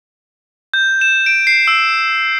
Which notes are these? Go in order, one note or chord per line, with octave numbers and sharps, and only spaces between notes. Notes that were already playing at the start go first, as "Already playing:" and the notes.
G6
E7
D7
C7
E6